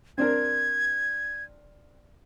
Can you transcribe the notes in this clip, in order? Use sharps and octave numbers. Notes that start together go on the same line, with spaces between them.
C4 D4 A#4 G#6